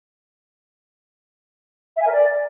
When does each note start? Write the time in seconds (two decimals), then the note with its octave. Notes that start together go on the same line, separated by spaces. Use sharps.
1.96 E5
2.02 G#5
2.07 A#4
2.12 D5